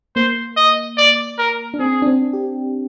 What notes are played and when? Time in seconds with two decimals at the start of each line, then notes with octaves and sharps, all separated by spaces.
0.16 A#3 C5
0.57 D#5
0.98 D5
1.38 A#4
1.74 D4
1.79 C4 G#4
2.02 D4
2.06 C4
2.33 G4